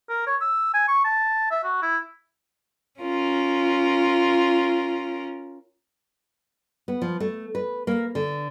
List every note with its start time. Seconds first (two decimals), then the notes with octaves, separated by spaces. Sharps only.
0.09 A#4
0.27 C#5
0.41 E6
0.74 G#5
0.88 C#6
1.05 A5
1.50 E5
1.64 F#4
1.82 E4
3.00 C#4 F4 A#4
6.88 B3
7.02 F3
7.20 A3
7.55 B4
7.87 A#3
8.15 D3